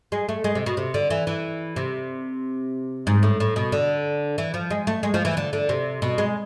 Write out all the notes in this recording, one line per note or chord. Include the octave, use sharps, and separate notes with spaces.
G#3
A3
G#3
C3
B2
C3
D3
E3
E3
C3
G#2
A2
A2
B2
D3
E3
F3
G#3
A3
G#3
F3
E3
D3
D3
C3
B2
G#3